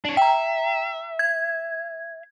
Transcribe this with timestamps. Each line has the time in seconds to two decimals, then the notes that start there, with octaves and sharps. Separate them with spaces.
0.05 D4 C#5
0.17 E5 G5 A#5
1.19 G#6